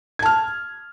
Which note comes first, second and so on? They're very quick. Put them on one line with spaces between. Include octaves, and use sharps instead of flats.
G#6 A5 F6